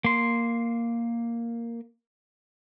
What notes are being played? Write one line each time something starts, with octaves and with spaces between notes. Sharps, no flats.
A#3 C6